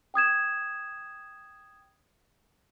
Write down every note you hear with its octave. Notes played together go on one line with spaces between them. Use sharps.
G5 D#6 G#6 E7